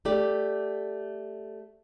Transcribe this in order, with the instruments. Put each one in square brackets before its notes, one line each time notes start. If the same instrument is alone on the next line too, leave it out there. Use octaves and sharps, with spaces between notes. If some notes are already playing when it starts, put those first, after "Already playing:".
[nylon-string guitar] A3 G4 D5